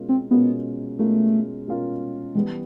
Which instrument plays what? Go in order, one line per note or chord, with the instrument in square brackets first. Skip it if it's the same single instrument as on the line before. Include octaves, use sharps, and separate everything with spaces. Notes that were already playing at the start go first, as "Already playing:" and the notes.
Already playing: [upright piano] B2 G#3 C#4 F4 A#4
[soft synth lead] C4
[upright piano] B2 G#3 C#4 F4 A#4 [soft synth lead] B3
[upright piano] B2 G#3 C#4 F4 A#4 [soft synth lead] A3
[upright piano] B2 G#3 C#4 F4 A#4
[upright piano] E3 G3 B3 [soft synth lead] G#3